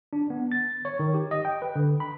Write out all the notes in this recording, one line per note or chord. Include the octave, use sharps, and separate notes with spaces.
D4
B3
A6
C#5
D#3
G4
D#5
G5
B4
D3
B5